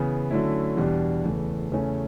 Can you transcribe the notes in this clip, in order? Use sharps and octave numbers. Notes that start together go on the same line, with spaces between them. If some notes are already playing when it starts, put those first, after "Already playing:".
Already playing: C#3 E3 B3
D3 F#3 A3 C#4 E4
E2 B2 G3 D4 G4
E2 C#3 E3 A3
E2 C#3 E3 A3 C#4